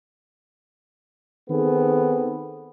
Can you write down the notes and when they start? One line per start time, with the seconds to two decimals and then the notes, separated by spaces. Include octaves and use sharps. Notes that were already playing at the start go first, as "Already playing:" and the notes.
1.49 D#3 B3 C4 G#4 A4